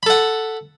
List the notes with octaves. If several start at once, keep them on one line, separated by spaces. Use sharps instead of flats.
A4 F#5 B5